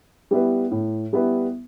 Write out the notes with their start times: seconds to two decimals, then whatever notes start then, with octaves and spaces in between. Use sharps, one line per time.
0.31 G3 B3 E4 B4
0.71 A2
1.13 G3 B3 E4 B4